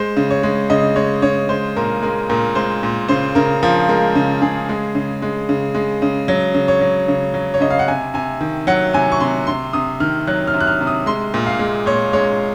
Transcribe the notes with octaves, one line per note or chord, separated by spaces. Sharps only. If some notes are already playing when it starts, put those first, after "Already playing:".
Already playing: G#3 C5
C#3
C#5
G#3
C#3 D#5
G#3 C#5
C#3 C#5
G#3 C5
A#2 A#4
G#3 A#4
A#2 A#4
G#3 C5
A#2
C#3 C5
C#3 A#4
F3 A#4
G#3 A#4
C#3
C#3 G#4
G#3
C#3
G#3
C#3
G#3
C#3
F#3
C#3
C#5
F#3
C#3
F#3
C#5
C#3 D#5
F5
F#5
C3 G#5
C3 G#5
D#3
F#3 F#5
C3 G#5
C#6
C3 C6
C3 C6
C3 D#6
D#3 F6
F#3 F#6
F6
C3
F#6
F6
C3
D#6
G#3 C6
A#2
F5
G#3
A#2 C#5
G#3 C#5